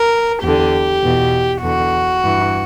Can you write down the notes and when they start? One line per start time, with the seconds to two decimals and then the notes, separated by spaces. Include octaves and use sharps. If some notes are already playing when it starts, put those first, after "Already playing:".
Already playing: A#4
0.42 E2 D3 G4
1.02 E2 B2
1.62 E2 D3 F#4
2.22 G2 E3